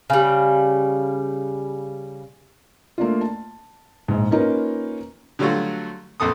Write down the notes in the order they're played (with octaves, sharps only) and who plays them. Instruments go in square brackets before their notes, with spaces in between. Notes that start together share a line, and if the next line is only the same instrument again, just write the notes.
[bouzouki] C#3 G3
[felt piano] A3 A#3 D4 F4
A5
A#1 G#2
A#3 C#4 D#4 F4 A#4 B4
[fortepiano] D3 F#3 G3 A3 F4 F#4
A#1 F2 A4 D#6